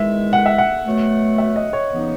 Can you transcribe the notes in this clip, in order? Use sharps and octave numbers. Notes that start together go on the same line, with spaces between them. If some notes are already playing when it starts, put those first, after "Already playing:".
Already playing: E2 D#3 G#3 E5
F#5
E5
F#5
B2 F#3 A3
E5
D#5
C#5
C#3 E3 B3 D#4